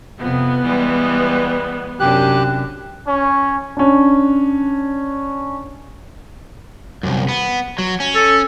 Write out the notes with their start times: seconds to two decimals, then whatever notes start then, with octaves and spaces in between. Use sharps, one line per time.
0.20 F2 C3 B3
0.63 E3 G3 G#3
2.00 F#2 C3 D4 G4 F#6
3.08 C#4
3.77 C#4 D4
7.03 C2 F#2
7.29 B3
7.79 F#3
8.00 C#4
8.15 A4